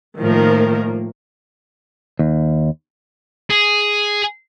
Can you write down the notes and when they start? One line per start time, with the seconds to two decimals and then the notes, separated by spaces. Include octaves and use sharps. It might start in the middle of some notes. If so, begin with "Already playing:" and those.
0.20 A2 D#3 F3 A#3 A#4
2.19 D#2
3.50 G#4